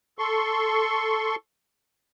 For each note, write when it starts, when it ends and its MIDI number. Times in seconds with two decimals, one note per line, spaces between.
0.18 1.35 69
0.18 1.35 84
0.18 1.35 85